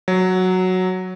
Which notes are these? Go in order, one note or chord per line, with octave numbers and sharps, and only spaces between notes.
F#3